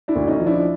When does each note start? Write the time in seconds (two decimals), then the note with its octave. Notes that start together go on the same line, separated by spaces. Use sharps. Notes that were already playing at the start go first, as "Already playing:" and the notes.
0.08 D4 E4
0.15 D2
0.27 C#4 D#4
0.40 F3
0.46 D4 E4